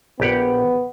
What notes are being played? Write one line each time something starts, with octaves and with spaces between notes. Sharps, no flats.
A#1 B3 G4 F#5